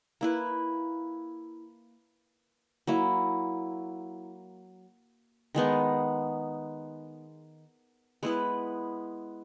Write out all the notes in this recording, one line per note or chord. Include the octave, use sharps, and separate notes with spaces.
A#3 E4 B4
F#3 A#3 E4
D#3 G#3 B3 D#4
G#3 B3 E4 B4